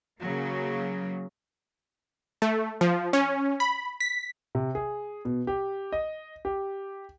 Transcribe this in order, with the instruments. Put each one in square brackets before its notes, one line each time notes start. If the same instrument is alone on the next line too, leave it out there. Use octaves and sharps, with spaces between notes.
[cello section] C#3 F#3 A#3
[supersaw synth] A3
F3
C#4
B5
B6
[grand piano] C3
G#4
B2
G4
D#5
G4